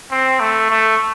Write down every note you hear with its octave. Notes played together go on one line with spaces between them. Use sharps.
C4
A3
A3